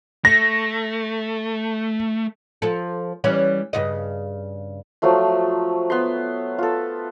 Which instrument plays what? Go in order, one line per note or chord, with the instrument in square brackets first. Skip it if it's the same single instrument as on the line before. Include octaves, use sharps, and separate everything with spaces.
[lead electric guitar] A3 [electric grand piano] A#6
[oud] F3 A4
E3 G3 C#4
G2 C#3 D#5
[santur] F3 F#3 A3 C6
B3 C6
F4 A4